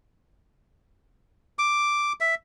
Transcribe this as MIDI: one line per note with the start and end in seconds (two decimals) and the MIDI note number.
1.59 2.13 86
2.20 2.35 76